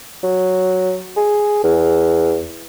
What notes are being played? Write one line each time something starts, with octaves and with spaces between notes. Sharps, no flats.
F#3
G#4
E2